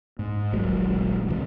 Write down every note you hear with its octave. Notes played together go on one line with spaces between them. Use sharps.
G#2
D#1 A#1 F#3 G#3
A1 G#2 C3 E3